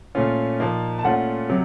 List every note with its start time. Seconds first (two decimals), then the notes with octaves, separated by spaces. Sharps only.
0.15 A#2 A3 C#4 F4
0.59 A#2 F3 A#3 D#4
0.99 A5
1.04 A#2 A3 C#4 F4 F#5
1.49 C3 F#3